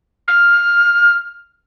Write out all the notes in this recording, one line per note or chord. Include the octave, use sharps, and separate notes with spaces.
F6